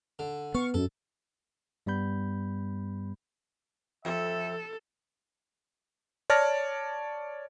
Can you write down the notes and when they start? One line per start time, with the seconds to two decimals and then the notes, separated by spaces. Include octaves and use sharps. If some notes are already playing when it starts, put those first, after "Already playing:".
0.19 D3
0.55 B3 F5 C#6
0.74 F#2 A4
1.86 G2 G3 B3 B5 G6
4.05 F2 A4 E5
6.30 C#5 D5 A5 F6 A#6